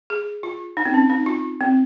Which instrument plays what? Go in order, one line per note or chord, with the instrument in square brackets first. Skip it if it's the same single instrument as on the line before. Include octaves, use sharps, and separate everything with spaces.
[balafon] G#4
F4
D#4
C4
C#4
D#4
F4
C4